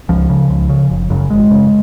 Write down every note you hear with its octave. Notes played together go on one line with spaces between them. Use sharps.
C#2 F3
C#3
C#2
C#3
F#1
F#2 C#3
G#1 G#3
F#2 C#3